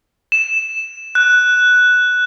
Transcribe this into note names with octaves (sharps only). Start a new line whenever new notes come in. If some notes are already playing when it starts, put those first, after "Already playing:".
E7
F#6